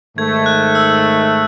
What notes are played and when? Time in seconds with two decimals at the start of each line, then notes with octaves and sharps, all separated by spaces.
0.17 G#2 D#3 A3 G#6
0.36 G#6
0.46 F#6
0.75 E6